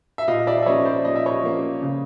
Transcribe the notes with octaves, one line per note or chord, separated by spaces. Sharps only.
E5
A#2 D#5 F5
D5 E5
E5
F3 A#3 C#4 C#5 D#5
C5 D5
A#2 D#5
E5
C#5 D#5
F3 A#3 C#4
C#3